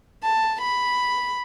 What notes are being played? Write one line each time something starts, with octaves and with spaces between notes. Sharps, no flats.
A5
B5